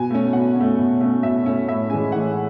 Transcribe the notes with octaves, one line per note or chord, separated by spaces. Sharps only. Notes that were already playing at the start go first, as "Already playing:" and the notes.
Already playing: B2 G#5
A3 C#4
B2 F#5
A3 C#4
B2
A3 C#4
B2 E5
A3 C#4
A2 E5
E3 G#3 C#4 G#5
A2 F#5